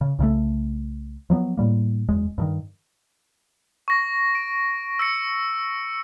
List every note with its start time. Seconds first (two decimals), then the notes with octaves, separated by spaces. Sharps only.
0.01 C#3
0.19 C2 C#3 E3 A3
1.30 F3 F#3 A#3 B3
1.57 A2 G3 A#3
2.09 F#1 E2 G#3
2.38 G2 D3 D#3
3.88 C#6 A#6
4.35 D7
4.99 E6 A#6 C#7